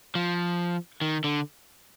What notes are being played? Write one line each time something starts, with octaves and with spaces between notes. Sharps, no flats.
F3
D#3
D3